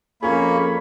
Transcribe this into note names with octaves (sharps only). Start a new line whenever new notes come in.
F2 A#3 C#4 F4 G#4 C#5 B5